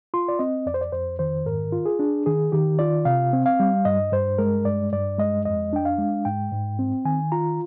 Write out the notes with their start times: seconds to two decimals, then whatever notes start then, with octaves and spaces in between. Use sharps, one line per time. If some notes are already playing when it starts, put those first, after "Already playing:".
0.14 F4 C6
0.28 D5
0.39 C4 D#5
0.66 F2 D5
0.74 C5
0.81 D5
0.92 F2 C5
1.19 D#3 C5
1.46 G#2 A#4
1.72 F4
1.86 G#4
1.99 D4
2.26 D#3 G#4
2.52 D#3 G4
2.79 F4 D5
3.05 C3 F5
3.33 C4
3.46 F5
3.60 G3
3.85 G2 D#5
4.13 G2 C5
4.38 G#3 A#4
4.65 G2 D5
4.92 G2 D5
5.18 G#3 D#5
5.45 F2 D#5
5.73 D4 G5
5.85 F5
5.98 G#3
6.25 G#2 G5
6.52 G#2
6.79 C4
7.05 D#3 G#5
7.32 F4 A#5